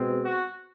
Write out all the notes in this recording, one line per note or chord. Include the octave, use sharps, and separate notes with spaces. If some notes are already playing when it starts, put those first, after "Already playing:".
Already playing: B2 G#3 C4
F#4